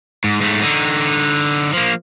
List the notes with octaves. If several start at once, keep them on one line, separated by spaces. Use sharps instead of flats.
G#2
G#2 A3
D3 D#4
F3 A#3